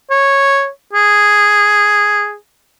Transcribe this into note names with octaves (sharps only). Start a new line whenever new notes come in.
C#5
G#4